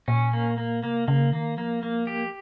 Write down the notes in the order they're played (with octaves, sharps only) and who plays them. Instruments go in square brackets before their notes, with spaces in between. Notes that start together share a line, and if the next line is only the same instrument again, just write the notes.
[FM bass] A#2 [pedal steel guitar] C#4
[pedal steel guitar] A#3
A#3
[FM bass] C3 [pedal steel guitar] A#3
[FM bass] C#3 [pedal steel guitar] A#3
[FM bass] D#3 [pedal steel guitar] A#3
[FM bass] F3 [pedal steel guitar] A#3
[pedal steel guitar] A#3
G4